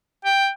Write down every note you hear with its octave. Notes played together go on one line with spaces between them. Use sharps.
G5